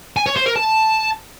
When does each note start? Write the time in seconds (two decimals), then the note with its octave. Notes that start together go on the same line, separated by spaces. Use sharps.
0.17 G#5
0.26 C#5
0.36 C5
0.46 A#4
0.56 A5